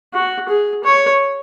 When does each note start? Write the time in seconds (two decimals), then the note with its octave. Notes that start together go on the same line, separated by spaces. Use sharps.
0.14 F#4
0.49 G#4
0.84 C#5